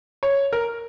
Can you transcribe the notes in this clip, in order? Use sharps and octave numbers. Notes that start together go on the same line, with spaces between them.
C#5
A#4